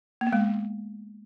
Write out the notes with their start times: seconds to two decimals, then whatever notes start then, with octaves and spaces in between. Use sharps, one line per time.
0.21 A#3
0.27 B3
0.33 G#3